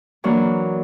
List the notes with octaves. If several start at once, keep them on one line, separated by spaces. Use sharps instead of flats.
E3 F#3 A#3 D4